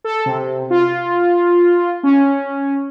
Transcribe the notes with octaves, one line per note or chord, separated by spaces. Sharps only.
A4
C3
F4
C#4